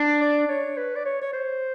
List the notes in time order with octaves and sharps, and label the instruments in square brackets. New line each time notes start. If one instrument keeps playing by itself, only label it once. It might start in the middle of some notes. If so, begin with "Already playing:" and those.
Already playing: [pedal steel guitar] D4
[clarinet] D5
C#5
B4
D5
C#5
C#5
C5